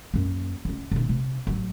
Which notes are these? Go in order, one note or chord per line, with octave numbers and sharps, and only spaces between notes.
F#2 A#3
D1 C#2
B2 D#3
C3
A1 F#3